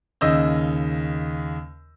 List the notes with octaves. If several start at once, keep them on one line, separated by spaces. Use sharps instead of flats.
D#2 C#3 D#5 E6 G6